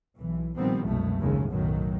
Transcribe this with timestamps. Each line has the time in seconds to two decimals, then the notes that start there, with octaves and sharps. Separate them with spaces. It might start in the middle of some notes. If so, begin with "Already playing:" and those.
0.18 B1 E3
0.57 A#2 D#3 F3 G3 B3 C4
0.86 C2 F#2 B2 E3 G#3 A3
1.20 A#1 D#2 C#3 G#3
1.49 B1 F#2 A2 D#3 F#3